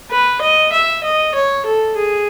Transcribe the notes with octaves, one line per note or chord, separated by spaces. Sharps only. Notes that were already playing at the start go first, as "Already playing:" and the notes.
B4
D#5
E5
D#5
C#5
A4
G#4